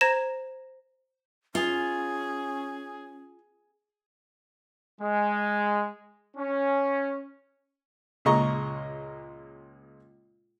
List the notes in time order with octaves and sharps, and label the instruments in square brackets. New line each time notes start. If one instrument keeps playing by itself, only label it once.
[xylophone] C5 A#5 G#6 A#6 E7
[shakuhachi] C#4 [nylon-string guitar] F4 [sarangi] G#4
[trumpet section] G#3
C#4
[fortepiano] C#2 A#2 G#3 D#5 A#5 C#6